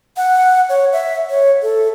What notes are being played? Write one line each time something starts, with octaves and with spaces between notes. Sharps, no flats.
F#5
C#5
E5
C#5
A4